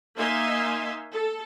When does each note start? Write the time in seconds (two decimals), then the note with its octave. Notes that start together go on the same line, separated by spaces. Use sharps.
0.16 A#3 D#4 E5 F5 G#5 C6
1.12 A4